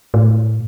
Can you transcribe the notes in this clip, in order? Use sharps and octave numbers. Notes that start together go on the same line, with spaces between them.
A2